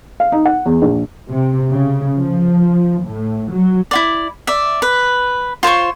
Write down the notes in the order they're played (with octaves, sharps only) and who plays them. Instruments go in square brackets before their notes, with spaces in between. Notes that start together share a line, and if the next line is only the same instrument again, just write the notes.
[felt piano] F5
D#4
F#5
E2
A#1
[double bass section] C3
C#3
F3
A2
F#3
[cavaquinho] E4 F4 D5
D5 E5
B4
F4 C5 C#5 C#6